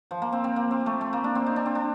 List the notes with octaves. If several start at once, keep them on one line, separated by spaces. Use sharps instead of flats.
F3
A#3
C4
C4
A#3
C4
A3
A3
A#3
D4
C4
D#4
D4
C4
D4